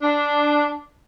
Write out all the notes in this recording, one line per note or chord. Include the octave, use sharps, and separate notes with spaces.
D4